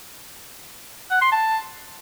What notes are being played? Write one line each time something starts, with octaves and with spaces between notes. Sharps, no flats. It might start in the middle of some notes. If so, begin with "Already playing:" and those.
F#5
C6
A5